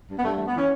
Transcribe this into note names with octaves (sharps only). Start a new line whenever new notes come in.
G2
B3
G2 A3
E3 A3
B3
E3 C#4